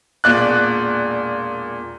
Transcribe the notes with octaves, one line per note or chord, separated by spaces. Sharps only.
E1 A#2 D5 F#6